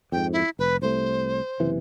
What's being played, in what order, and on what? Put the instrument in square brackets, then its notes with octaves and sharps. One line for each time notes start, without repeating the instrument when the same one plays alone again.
[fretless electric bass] F2 G#2 [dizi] G5
[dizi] E4
[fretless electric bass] F1 [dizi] B4
[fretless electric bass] C2 A3 [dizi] C5
[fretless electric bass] F#1 C3 E3